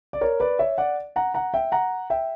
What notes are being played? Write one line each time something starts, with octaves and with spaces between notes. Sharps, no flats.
D5
A#4 C#5
B4 D5
C#5 E5
D5 F#5
F#5 A#5
F#5 A#5
E5 G5
F#5 A#5
E5 G5